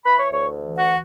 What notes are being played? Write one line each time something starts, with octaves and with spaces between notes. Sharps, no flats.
E3 B4 B5
C#5 C#6
D2 C#5 C#6
E3
F#4 F#5